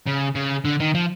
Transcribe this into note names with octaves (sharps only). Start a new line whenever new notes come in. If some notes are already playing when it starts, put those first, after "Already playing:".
C#3
C#3
D3
D#3
F3